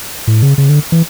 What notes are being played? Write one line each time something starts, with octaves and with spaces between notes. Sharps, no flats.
A2
C#3
C#3
D3
E3